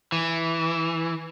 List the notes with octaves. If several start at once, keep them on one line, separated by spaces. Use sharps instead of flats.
E3